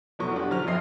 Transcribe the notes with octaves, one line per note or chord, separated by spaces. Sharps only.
F1 B2 F#3 C#6
D4 F#4 G4
D3 F3 F#3 F6 F7
A#1 F2 D#5 E5 C7